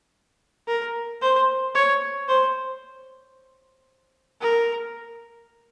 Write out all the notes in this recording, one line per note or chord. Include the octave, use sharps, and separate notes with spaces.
A#4
C5
C#5
C5
A#4